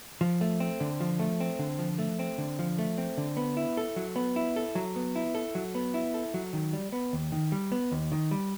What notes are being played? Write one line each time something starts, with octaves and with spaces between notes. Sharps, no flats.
F3
A3
C4
D3
F3
A3
C4
D3
F3
A3
C4
D3
F3
A3
C4
D3
B3
E4
A4
F#3
B3
E4
A4
F#3
B3
E4
A4
F#3
B3
E4
A4
F#3
D#3
G3
B3
D#2
D#3
G3
B3
D#2
D#3
G3